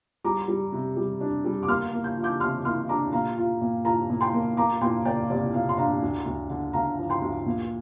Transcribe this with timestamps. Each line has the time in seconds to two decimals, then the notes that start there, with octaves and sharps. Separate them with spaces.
0.25 G3 A#5 D6
0.48 G3
0.72 C3
0.96 G3
1.20 D4
1.45 G3
1.63 D6
1.68 A#3 C6 F6
1.93 A#3
2.04 G6
2.17 F4
2.23 D6 G6
2.40 C3 C6 F6
2.65 A#3 C6 F6
2.89 D4 A#5 D6
3.13 A#2 F5 A#5
3.38 F4
3.61 A#2
3.85 F4 F5 A#5
4.10 A#2
4.21 G5 C6
4.34 A#3
4.57 A#3 A#5 D6
4.81 A#2 G5 C6
5.05 A#3 D5 G5
5.30 C2 D5
5.53 A#2 F5
5.69 C6
5.77 D4 F5 A#5
6.02 D2
6.26 D2
6.50 D3
6.73 D2 F5 A#5
6.98 F3
7.10 G5 C6
7.22 D2
7.46 A#2